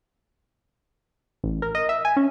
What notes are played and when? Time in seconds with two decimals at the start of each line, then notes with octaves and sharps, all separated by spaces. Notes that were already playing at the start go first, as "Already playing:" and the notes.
1.44 A1
1.62 A#4
1.75 D#5
1.89 E5
2.05 G#5
2.16 C#4